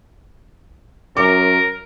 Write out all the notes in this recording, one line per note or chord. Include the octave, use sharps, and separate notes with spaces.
F#2 A#4 D6